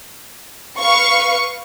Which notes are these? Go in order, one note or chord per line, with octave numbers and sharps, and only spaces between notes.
B4 F5 C#6